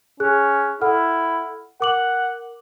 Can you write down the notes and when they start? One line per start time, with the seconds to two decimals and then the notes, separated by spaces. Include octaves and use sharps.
0.20 C#4 G#4 F#6
0.81 E4 A4 F#5 F6
1.81 A#4 F#5 D6 F#7